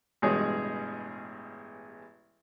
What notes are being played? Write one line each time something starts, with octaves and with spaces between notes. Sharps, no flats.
A1 G2 B2 G#3 G#4 C#5